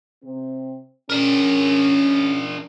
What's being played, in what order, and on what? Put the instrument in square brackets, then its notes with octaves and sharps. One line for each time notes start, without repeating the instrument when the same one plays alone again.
[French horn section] C3 C4
[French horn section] C#4 [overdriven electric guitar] D4 A#4